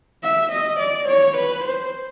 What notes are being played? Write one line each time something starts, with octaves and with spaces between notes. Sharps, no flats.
E5
D#5
D5
C#5
B4
C5